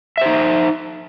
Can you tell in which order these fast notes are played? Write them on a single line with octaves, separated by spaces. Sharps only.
E5 C5 D#4